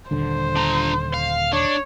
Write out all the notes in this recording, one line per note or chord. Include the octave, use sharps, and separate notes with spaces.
D#1 D3 C5
D4 A#5
F5
D4 C#5